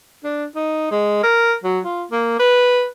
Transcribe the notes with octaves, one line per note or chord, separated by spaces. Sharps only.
D4
D#4
G#3
A#4
F#3
F4
A#3
B4